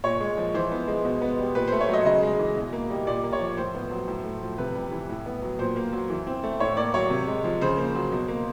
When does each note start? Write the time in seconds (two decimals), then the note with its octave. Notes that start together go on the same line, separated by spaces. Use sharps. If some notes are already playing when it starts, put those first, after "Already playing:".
0.04 A#2 C#5
0.20 G#3
0.38 F3
0.54 E3 C5
0.71 B3
0.88 G#3
1.05 B2
1.22 B3
1.39 G3
1.55 A#2 B4
1.67 A3 C5
1.81 C#5
1.89 F#3 D#5
2.05 C#3 D#5
2.23 G#3
2.39 E3
2.56 B2
2.73 A#3
2.90 G3
3.07 A#2 D5
3.23 A#3
3.33 C#5
3.41 F3
3.57 A2 C5
3.75 B3
3.91 F#3
4.08 A2
4.25 A3
4.42 F3
4.58 C3 B4
4.75 G3
4.92 E3
5.09 A2
5.26 B3
5.42 F#3
5.59 A#2 C5
5.76 A#3
5.93 F#3
6.10 E3
6.27 C4
6.43 A3
6.60 A2 C#5
6.77 A#3 D5
6.94 F#3 C#5
7.10 C3
7.27 G#3
7.44 F3
7.61 C#3 C5
7.77 A#3
7.95 F#3
8.12 B2
8.28 A#3